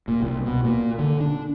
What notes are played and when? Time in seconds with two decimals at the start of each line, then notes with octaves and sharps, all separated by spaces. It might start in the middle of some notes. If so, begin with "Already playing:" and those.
0.08 A#2
0.22 C2
0.46 B2
0.64 A#2
0.99 D3
1.20 D4